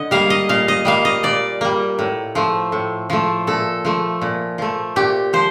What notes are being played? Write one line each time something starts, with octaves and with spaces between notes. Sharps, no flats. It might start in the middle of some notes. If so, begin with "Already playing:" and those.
Already playing: D3 D#5
G3 A#3 F5
D#5
A#2 F5
D#5
G3 A#3 F5
D#5
A#2 D5
G3 A#3
A2
F3 A3
A2
F3 A3
A#2 A4
F3 A3
A#2
F3 A3
A#2 G4
F3 C5